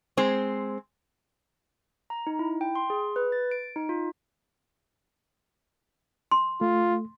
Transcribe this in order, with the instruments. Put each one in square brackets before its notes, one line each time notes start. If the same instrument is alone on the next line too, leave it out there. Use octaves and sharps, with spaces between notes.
[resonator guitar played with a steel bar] G#3 C4 C5
[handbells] A#5
D#4
E4
G5
C6
G#4
B4
A6
D7
D#4
F4
[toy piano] C6
[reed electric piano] A3 [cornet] F4